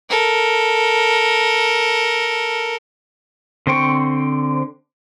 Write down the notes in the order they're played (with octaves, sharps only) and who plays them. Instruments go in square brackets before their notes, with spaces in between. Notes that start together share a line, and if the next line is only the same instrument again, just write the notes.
[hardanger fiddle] A4 A#4
[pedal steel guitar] D3 C4 C5 G5 C#6